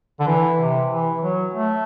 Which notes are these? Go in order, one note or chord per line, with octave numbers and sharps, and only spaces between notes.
D3
E3
C3
E3
F#3
A3